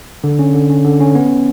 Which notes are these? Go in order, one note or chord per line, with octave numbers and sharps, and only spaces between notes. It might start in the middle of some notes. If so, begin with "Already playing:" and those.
D3
C#4
D3
C#4
D3
C#4
B3